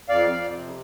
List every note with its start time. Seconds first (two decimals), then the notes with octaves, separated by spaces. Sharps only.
0.09 F2 D5 F5
0.31 F2
0.51 C3